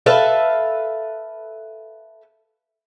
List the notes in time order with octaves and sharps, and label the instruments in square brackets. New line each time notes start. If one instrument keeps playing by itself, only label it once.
[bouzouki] A4 B4 E5 F5